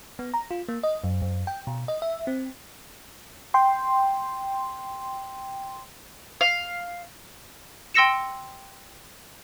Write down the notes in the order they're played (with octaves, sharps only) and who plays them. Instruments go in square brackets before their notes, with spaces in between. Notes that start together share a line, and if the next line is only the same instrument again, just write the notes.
[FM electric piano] B3
A#5
F4
A#3
D#5
F#2
F#2
G5
B2
D#5
E5
C4
G5 C6
[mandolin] F5
[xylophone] G5 C6 E6 A#6 C#7 E7